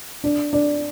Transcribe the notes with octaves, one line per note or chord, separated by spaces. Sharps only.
D4
D4